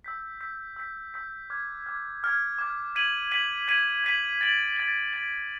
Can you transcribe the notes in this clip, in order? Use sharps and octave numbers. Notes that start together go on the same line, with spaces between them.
E6 G6 B6
E6 G6 B6
E6 G6 B6
E6 G6 B6
D6 F6 G#6
D6 F6 G#6
D6 F6 G#6
D6 F6 G#6
G#6 B6 D#7 F#7
G#6 B6 D#7 F#7
G#6 B6 D#7 F#7
G#6 B6 D#7 F#7
A6 D7 F#7
A6 D7 F#7
A6 D7 F#7